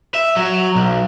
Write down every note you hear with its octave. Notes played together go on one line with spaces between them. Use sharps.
E5
F#3
B1